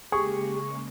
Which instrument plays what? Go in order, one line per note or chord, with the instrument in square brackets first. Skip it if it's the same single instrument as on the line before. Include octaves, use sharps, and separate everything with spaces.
[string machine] C#3 G#3 A#3 [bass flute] G4 [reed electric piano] G#4 [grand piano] C#6